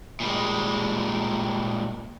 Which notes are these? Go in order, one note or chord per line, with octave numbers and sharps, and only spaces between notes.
A#2 G3 G#3